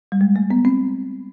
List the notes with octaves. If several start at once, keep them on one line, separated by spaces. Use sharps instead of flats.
G3
G#3
A3
B3
C4